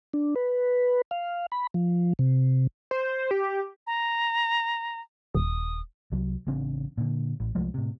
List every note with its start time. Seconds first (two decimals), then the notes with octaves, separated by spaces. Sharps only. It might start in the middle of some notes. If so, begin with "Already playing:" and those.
0.13 D4
0.35 B4
1.11 F5
1.52 B5
1.74 F3
2.19 C3
2.91 C5
3.31 G4
3.87 A#5
5.35 D#1 D#6
6.12 C2 F#3
6.47 A1 C#3 C4 D4
6.97 A#2 D3
7.40 A1
7.55 C2 F3 G#3 A3
7.74 A2 C3